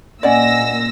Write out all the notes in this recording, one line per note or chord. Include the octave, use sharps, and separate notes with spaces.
A#2 C#4 D5 D#5 F#5 G#5 E6 A#6